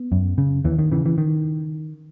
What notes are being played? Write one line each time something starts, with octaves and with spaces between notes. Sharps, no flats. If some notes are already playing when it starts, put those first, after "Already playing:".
Already playing: B3
F#2
C#3
D#2 E3
D#3
C#3 E3
E3
D#3